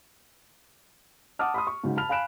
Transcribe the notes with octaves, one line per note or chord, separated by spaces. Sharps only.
F#5 A5 D6 D#6 F6
B5 C6 D#6
C#6
G#2 C#3 F#3
A5 B5 F6 F7
F5 G#5 B5 F#6 D7 E7